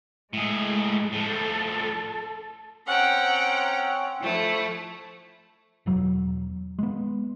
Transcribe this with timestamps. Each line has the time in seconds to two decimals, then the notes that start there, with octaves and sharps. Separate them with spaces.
0.33 A2 G#3 G#4
1.12 A2 F3 A4
2.87 C4 C#4 F#5 G5 A#5
4.20 F3 A3 E4
5.86 E1 E2 F#3
6.79 G#3 B3